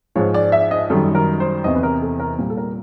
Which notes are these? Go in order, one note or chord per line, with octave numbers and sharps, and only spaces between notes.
G#2 F3 G#3 C#5
D5
E5
D#5
F#2 D#3 G3 A4
A#4
C5
E2 C3 E3 D#5
B4
A#4
A4
A#4
A#2 G3
A4
A#4